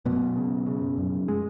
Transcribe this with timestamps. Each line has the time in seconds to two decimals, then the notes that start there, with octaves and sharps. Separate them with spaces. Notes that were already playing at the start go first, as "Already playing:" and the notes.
0.05 F#2 B2 B3
0.36 C#3
0.67 C#3
0.98 F#2
1.28 G#3